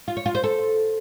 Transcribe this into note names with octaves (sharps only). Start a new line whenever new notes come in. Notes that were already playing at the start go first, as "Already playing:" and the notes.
F4
C#5
F4
C5
A4